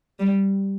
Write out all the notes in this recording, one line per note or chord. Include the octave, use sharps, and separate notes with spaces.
G3